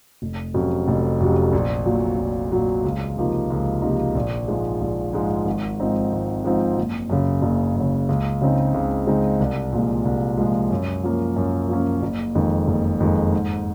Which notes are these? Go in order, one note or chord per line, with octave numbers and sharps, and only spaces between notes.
F1
F2 C3 F#3 C#4
F1
F2 C3 F#3 C#4
A#1
A#2 F#3
A#1
A#2 F#3
C#2
C3 F3 A#3 D#4
C#2
C3 F3 A#3 D#4
A#1
G#2 F3 G#3
A#1
G#2 F3 G#3
G#1
G#2 F3 C4 D#4
G#1
G#2 F3 C4 D#4
F#1
F#2 C#3
F#1
F#2
C#3
C#2
C#3 G#3 C4 D#4
C#2
C#3 G#3 C4 D#4
C2
A#2 F3 G#3
C2
A#2 F3 G#3
F#2
F3 A#3 C#4
F#2
F3 A#3 C#4
F#1
F2 D#3 G#3
F#1
F2 D#3 G#3
G#2